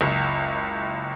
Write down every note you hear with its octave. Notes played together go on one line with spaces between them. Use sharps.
F#1 C#2